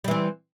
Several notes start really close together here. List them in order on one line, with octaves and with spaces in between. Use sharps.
G3 E3 C4